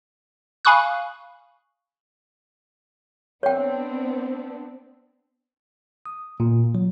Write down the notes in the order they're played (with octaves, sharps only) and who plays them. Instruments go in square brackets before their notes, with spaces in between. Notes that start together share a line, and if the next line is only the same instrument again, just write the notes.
[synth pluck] F5 G#5 B5 C#6 D#6 F#6
[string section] B3 C4 D4 [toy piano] C#5 G5
[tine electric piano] D#6
A#2
F#3